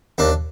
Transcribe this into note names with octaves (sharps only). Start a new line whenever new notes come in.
D#2 D4